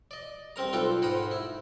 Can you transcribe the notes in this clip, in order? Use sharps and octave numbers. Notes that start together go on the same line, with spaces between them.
D5 D#5
C2 C3 C4 A#4 A#5
B1 F4 A4 B4 D5 G5
G#2 A#4 C5 F#5 B5 D#6
E4